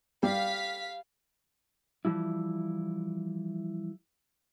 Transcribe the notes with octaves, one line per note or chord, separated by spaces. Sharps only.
G3 F5 B6
E3 F3 G3 E4